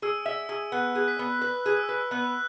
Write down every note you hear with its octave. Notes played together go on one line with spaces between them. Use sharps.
G#4 E6
E5 E6
G#4 E6
B3 F#6
G#4
B6
B3
B4 F#6
G#4
E6
B4 F#6
E6
B3 F#6